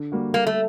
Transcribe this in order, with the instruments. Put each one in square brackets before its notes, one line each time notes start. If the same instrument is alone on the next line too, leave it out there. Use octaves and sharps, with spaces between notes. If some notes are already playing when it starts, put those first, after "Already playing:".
Already playing: [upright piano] D3
G3 A#3 F#4
[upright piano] G3 [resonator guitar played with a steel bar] A#3
[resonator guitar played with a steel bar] A3